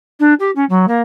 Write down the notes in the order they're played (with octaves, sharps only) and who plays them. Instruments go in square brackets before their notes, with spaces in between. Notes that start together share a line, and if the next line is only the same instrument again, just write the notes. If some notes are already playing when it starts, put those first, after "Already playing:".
[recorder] D4
G4
C#4
F#3
A#3